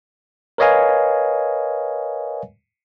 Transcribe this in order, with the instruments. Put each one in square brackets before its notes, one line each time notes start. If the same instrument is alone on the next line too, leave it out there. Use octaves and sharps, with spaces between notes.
[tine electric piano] A#4 B4 C#5 D#5 F5 G#5